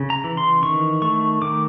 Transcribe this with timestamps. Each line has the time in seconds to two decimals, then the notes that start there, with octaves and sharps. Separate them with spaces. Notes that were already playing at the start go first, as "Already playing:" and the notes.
Already playing: C#3
0.10 A#5
0.24 E3
0.37 C6
0.63 D#3 C#6
1.02 A3 C#6
1.42 D#3 D6